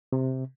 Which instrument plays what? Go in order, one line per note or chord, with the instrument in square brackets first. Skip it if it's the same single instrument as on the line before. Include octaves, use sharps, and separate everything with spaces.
[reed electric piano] C3